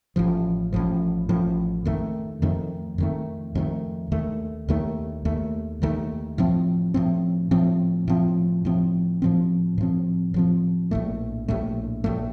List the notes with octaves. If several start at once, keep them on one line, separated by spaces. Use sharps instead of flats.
A1 A2 F3
A1 A2 F3
A1 A2 F3
F2 D#3 A3
F2 D#3 A3
F2 D#3 A3
F2 D#3 A3
D#2 D#3 A3
D#2 D#3 A3
D#2 D#3 A3
D#2 D#3 A3
A2 F3 C4
A2 F3 C4
A2 F3 C4
A2 F3 C4
A2 F3 C4
A2 F3 C4
A2 F3 C4
A2 F3 C4
A#1 A2 A3
A#1 A2 A3
A#1 A2 A3